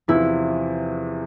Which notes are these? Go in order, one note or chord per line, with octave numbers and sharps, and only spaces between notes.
E2 C3 F3 E4